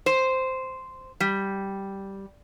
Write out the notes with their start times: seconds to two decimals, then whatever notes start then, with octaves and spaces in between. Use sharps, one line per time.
0.06 C5
1.20 G3